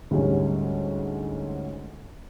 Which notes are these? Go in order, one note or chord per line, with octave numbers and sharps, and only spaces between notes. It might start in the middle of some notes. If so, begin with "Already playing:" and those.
D2 G#2 G3 C#4